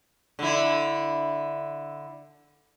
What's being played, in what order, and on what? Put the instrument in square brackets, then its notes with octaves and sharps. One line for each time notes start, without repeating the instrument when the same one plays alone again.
[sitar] D3 E4